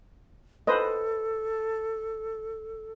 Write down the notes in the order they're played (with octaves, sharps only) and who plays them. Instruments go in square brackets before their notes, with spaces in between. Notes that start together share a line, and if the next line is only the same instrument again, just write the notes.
[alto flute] A4 [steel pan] B4 C5 D#5